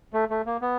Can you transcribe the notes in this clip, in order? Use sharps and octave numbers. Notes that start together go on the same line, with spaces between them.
A3
A3
A#3
B3